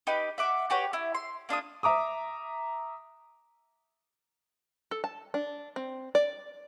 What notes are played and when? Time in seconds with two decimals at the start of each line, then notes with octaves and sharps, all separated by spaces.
0.07 D#4 G4 B4
0.38 E5 F#5 D6
0.70 F#4 G4 B4 C#5
0.93 E4
1.15 C6
1.49 A#3 D4 F4 D#6
1.83 E5 A#5 D6 D#6
4.91 A4
5.04 A5
5.34 D4
5.76 C4
6.15 D5